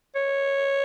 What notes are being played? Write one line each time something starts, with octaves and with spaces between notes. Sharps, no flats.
C#5